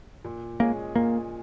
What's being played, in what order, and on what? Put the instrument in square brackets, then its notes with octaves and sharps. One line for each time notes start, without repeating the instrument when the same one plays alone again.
[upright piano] A#2
[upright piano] G#3 C#4 G#4 [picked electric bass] A#3
[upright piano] A#2 [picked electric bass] A#3